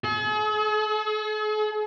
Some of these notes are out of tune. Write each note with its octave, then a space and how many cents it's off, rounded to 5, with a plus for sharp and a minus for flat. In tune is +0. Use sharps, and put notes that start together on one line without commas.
G#4 +45